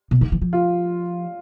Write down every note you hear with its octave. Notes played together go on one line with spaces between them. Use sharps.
B2
D#3
E3
F3
F4